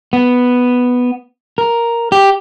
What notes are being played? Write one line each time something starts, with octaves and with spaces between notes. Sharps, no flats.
B3
A#4
G4